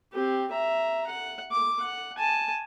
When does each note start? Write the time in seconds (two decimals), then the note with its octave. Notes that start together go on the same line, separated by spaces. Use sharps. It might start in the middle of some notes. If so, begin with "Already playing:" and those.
0.13 C4 G4
0.51 E5 A#5
1.07 F#5
1.51 D6
1.81 F#5
2.18 G#5 A5